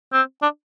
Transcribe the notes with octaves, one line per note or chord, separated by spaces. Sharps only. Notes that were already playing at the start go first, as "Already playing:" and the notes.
C4
D4